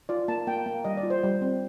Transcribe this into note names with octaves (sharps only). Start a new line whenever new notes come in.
F4 D5
A#3 A5
A#3 G5
A#3
G3 D#5
D5
F4
C5
G3
C4